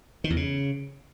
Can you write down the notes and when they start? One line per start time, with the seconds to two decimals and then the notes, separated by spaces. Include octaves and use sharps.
0.24 D#3
0.30 E2
0.37 C#3